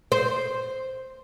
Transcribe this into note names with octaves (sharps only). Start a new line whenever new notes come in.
C5